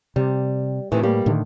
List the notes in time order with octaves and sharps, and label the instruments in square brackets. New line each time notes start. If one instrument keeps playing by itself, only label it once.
[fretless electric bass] C3 [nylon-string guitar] G3
[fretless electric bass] A2 [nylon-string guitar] C3 D#3 E3
[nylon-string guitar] G3 A#3 G4
[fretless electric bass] A2 D3 D#3